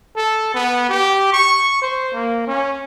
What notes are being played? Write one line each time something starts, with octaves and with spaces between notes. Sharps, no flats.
A4
B3
G4
C#6
C5
A#3
C#4